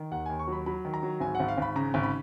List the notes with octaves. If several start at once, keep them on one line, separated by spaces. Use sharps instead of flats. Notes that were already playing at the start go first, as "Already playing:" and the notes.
Already playing: D#3
D#2 F#5
D#2 G#5
C#6
F#3 B5
F#3 B5
D#3
A#5
F#3
G#1 G#5
G#1 F#5
F5
G#1 B5
C#3 A#5
G#1
B5